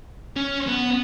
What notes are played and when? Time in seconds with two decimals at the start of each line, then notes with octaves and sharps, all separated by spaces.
0.37 C#4
0.67 B3